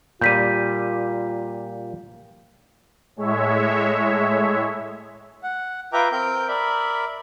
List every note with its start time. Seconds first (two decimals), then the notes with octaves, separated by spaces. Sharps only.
0.21 A#2 G3 F4 G6 B6 D#7
3.16 A2 G#3 C#5 E5
5.43 F#5
5.93 F4 B4 E5 G5 A#5 D6
6.12 C4 A#4 G5 G6
6.48 A#4 D5 E5 B5